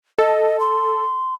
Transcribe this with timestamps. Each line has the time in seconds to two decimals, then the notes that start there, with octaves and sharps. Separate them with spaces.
0.18 A4 D#5
0.60 C6